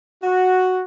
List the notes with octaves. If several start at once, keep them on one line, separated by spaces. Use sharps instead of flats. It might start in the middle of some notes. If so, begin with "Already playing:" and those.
F#4